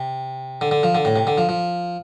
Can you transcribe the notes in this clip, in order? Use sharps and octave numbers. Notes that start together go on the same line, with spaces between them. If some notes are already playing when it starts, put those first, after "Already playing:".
Already playing: C3
D3
D3
F3
D3
A2
C3
D3
F3
F3